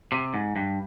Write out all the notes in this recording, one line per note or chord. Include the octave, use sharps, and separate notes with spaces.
C3
G#2
G2